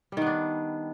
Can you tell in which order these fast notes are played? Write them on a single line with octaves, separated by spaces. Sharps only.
G3 D#3 B3 D4